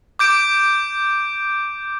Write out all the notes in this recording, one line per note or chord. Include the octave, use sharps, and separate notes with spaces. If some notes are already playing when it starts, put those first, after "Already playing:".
D6 G6 D7